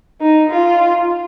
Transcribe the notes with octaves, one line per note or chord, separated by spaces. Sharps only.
D#4
F4